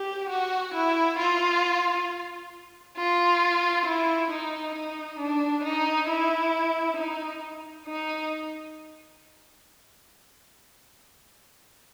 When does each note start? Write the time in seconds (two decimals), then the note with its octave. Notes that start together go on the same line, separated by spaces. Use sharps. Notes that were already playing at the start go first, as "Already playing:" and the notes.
Already playing: G4
0.30 F#4
0.74 E4
1.19 F4
2.97 F4
3.85 E4
4.30 D#4
4.74 D#4
5.19 D4
5.64 D#4
6.09 E4
6.97 D#4
7.86 D#4